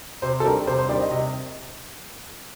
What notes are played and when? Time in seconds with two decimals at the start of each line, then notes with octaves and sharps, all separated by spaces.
0.22 C3 C5
0.40 A4
0.45 D#3 G3 D4 A#4
0.67 C3 C5
0.78 C5
0.89 D#3 G3 D4 D5
1.00 D#5
1.11 C3 D#5